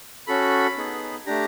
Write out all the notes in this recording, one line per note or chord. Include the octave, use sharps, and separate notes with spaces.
C#4 F#4 A4 B5
B3 D#4 G#4
A3 D4 G4 A#5